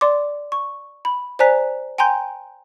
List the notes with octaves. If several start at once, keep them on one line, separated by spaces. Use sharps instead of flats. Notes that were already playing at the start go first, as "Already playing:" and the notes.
D5 C6 D6
C#6
B5
C5 D5 G#5 A#5 F#6 B6
G5 G#5 A#5 C6 G6